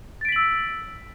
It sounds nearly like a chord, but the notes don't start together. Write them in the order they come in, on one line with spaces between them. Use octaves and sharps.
A6 D7 B6 F#7 E6